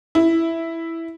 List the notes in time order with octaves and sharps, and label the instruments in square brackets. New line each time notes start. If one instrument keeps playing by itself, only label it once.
[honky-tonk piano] E4